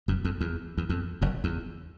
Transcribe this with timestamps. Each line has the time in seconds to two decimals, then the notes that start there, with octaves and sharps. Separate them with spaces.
0.08 F#1 F#2
0.25 F2
0.41 E2
0.78 E2
0.89 F2
1.22 F#1 F#2
1.44 E2